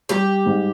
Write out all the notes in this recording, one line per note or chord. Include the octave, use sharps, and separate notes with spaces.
G3 G4
G#2